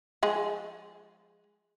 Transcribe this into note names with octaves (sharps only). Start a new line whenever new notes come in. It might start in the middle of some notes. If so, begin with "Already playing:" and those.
F3 G#3 G#4